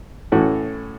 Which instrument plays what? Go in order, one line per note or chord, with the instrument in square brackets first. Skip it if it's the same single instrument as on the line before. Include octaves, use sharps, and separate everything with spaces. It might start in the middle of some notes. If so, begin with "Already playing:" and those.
[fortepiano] A2 E3 A3 C#4 F#4